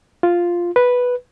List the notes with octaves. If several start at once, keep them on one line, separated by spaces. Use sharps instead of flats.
F4
B4